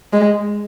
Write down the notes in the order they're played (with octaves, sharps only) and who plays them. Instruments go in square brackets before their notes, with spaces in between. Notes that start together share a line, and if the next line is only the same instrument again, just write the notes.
[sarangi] G#3